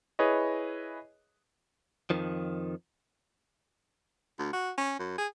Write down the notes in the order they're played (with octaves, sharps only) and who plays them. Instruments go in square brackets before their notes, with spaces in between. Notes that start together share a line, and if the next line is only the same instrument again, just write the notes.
[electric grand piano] E4 G#4 B4 C#5 D#5
[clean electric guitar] F2 D#3 F3
[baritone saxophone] D2
F#4
C#4
F#2
G#4